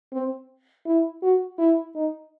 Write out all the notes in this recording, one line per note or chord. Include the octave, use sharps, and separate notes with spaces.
C4
E4
F#4
E4
D#4